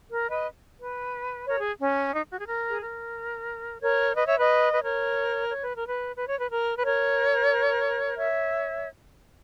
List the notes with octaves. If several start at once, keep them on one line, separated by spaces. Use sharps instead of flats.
A#4
B4 D#5
B4
A#4 C#5
G#4
C#4
D#4
F#4
G#4
A#4
G#4
A#4
A#4 C#5
B4 D#5
C#5 E5
B4 D#5
B4
A#4 C#5
C#5
B4
A#4
B4
B4
C#5
B4
A#4
B4
A#4 C#5
C#5 E5